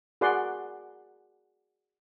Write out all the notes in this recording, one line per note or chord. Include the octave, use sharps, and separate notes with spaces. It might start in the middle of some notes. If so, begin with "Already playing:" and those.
F#4 G#4 A#4 D5 F#5 C6